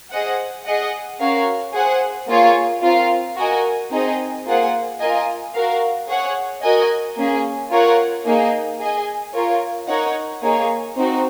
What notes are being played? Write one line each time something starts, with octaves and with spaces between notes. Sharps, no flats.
G#4 C5 D#5 F#5
G#4 D#5 F#5
C#4 F#4 A#4 C#5 F5
G#4 C5 F#5
A#3 F4 G#4 C#5
C4 F4 A#4 F5
F#4 A#4 D#5 G#5
C4 D#4 G#4 D#5
A#3 F4 G#4 C5 F#5
F4 A#4 D#5 G#5
F#4 A#4 F5
G#4 C#5 F#5
F#4 A#4 D#5 G#5
A#3 C#4 G#4
F4 A#4 C#5 F#5
A#3 D#4 G#4 D#5
G#4 D#5 G#5
F4 A#4 C#5
D#4 A#4 C#5 F#5
A#3 D#4 G#4 C#5
C4 D#4 F#4